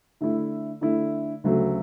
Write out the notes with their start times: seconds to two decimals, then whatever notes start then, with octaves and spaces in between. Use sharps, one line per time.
0.21 D3 A3 E4
0.81 D3 A3 E4
1.44 D2 C#3 F#3 A3